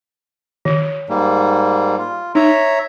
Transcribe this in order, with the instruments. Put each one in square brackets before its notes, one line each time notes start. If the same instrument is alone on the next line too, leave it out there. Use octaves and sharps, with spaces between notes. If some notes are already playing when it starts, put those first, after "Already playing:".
[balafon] D#3
[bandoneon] G#2 G3 A#3
F4
[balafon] D#4 [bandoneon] C#5 E5 A#5